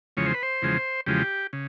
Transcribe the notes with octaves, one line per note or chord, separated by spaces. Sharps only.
E2 C#3 F3 G#3 C#5
C5
B4
C5
E2 C#3 F3 G#3
E2 C#3 F3 G#3 G4
C#3